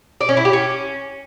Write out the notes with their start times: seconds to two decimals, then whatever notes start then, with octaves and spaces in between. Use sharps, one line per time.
0.21 D5
0.29 C#4
0.37 E4
0.45 G4
0.53 C#4